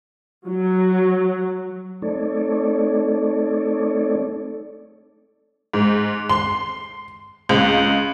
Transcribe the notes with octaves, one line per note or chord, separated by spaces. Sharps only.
F#3
A3 C4 D#4 A4 C#5 D5
G#2
C6
C#2